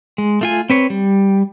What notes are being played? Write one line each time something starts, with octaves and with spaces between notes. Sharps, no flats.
G#3
A3 F4 G#5
C4 B4 C#5
G3